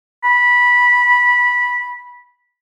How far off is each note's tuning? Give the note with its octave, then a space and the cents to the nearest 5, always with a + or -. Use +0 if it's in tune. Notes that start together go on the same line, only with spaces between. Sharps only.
B5 -15